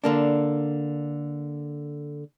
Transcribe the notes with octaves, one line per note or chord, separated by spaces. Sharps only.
D3 A#3 D4